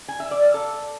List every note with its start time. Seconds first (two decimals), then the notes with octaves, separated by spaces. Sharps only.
0.08 G#5
0.20 E5
0.31 D5
0.43 F5
0.54 A4